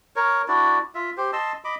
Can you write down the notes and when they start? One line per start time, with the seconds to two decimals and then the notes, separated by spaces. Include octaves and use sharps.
0.16 A#4 C#5
0.48 D4 E4 F#4 D5
0.95 F4 E5
1.17 G4 C5
1.33 D#5 A5 C6 E6
1.64 D#5 B5 D6